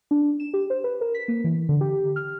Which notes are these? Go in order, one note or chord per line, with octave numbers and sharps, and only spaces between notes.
D4
E7
G4
C5
B4
A#4
B6
A#3
E3
D3
G4
F6